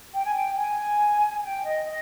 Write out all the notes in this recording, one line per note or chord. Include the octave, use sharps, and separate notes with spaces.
G5
G#5
G5
G#5
G5
D#5
D#5